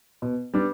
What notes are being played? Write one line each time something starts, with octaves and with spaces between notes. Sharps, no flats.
B2
G3 B3 D4